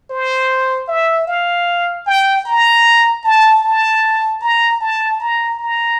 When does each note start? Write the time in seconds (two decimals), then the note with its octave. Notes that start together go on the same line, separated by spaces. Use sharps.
0.10 C5
0.88 E5
1.28 F5
2.07 G5
2.45 A#5
3.24 A5
3.63 A5
4.41 A#5
4.80 A5
5.20 A#5
5.59 A#5